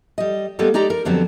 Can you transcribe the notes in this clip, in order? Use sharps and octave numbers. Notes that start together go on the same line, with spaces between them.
G3 D#5
G3 G#3 A#3 B3 A4
G#3 D#4 G4 D5 A#5
A#4
F2 D3 F#3 B3 C4